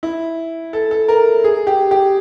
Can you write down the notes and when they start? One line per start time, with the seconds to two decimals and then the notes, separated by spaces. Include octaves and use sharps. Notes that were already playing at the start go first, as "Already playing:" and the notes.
0.03 E4
0.73 A4
0.91 A4
1.08 A#4
1.44 G#4
1.67 G4
1.91 G4